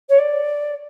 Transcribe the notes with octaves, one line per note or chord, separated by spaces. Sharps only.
C#5
D5